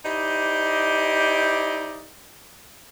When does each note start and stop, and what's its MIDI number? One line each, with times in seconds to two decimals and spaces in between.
0.04 2.08 63
0.04 2.08 64
0.04 2.08 67
0.04 2.08 72
0.04 2.08 74
0.04 2.08 75